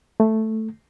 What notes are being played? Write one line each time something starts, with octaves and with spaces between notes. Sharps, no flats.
A3